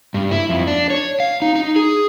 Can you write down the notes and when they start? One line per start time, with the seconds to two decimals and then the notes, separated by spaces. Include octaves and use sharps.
0.14 G2
0.31 E4
0.50 F2
0.67 D4
0.90 C#5
1.20 F5
1.42 D#4
1.56 D#4
1.76 G#4